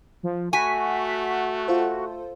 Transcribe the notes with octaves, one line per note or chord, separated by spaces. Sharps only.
F3
A3 F#4 G#5 C#6 B6
F4 A4 C5